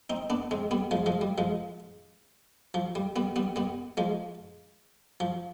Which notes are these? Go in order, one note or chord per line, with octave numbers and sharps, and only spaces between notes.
C4 D#4
B3 D4
G#3 C4
G3 B3
F3 G#3
F3 G#3
G3
F3 G#3
F3
G3
G3 B3
G3 B3
G3 B3
F3 G#3
F3